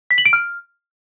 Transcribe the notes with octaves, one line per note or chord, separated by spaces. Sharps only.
B6
F#7
D7
F6